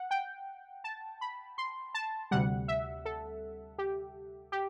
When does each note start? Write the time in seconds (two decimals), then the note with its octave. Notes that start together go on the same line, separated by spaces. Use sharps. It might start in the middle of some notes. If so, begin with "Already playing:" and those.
Already playing: F#5
0.11 G5
0.84 A5
1.21 B5
1.58 C6
1.94 A5
2.31 D2 C3 G3 F#5
2.68 E5
3.05 A4
3.78 G4
4.52 G4